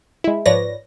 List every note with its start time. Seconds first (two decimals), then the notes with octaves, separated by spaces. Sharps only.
0.24 G#3 E4
0.46 G#2 F3 B4 C#5 D5 A#6